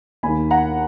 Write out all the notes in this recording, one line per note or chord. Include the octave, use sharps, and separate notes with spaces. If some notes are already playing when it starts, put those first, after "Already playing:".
D#2 D#3 G#5 B5
F#5 A#5